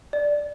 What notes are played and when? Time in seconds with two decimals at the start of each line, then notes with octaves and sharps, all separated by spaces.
0.13 D5